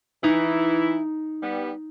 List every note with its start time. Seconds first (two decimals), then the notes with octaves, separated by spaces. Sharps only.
0.24 E3 D#4 E4
1.42 G3 B3